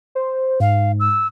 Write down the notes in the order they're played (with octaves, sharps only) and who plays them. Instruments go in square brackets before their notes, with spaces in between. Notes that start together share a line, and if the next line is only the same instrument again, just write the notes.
[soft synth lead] C5
[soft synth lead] G#2 [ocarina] F5
[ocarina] E6